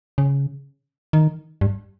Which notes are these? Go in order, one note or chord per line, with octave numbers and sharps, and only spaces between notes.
C#3
D#3
G2